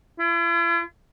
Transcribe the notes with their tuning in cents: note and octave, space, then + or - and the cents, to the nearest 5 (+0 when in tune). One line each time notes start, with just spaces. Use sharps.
E4 +45